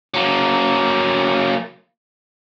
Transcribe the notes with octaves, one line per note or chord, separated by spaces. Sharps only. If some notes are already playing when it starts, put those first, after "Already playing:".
F#3 A#3